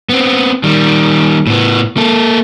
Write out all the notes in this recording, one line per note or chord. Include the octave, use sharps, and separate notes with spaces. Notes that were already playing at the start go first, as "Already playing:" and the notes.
B3 C4
D#3 G3
A2 B3
A#3 A4